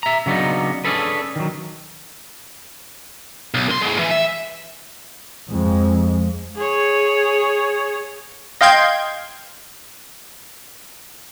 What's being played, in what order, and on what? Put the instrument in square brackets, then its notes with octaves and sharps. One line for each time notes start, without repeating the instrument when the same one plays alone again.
[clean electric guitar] E5 A#5
C#3 F#3 B3 D4 D#4
C#4 D4 G#4 A4 B4
D#3 F#3
[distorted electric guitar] B1
F#2 C6
A2 G#3
E3
E5
[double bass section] F2 G#3
[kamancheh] G#4 C#5
[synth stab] D#5 F5 G5 C6 G6 G#6